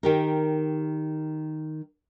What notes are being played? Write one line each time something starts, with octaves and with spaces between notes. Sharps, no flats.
D#3 G4 A#4